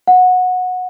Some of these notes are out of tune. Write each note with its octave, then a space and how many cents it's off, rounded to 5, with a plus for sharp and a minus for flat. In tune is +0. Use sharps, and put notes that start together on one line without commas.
F#5 -15